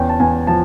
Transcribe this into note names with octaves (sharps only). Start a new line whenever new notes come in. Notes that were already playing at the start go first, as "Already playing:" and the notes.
Already playing: E2 C#4 G5
A5
E2 G#5
F3 A5